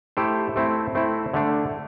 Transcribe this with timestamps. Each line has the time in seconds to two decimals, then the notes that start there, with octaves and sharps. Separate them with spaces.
0.17 A3 E4 G4 C5
0.56 A3 C4 E4
0.95 A3 C4 E4
1.34 D3 A3 D4